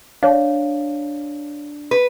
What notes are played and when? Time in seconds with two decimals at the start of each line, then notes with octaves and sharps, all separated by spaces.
0.23 D4 C#5 F5
1.91 B4